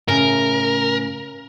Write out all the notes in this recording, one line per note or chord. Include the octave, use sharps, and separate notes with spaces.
A2 C#3 A#4